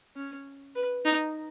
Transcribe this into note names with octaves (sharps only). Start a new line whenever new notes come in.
C#4
B4
D#4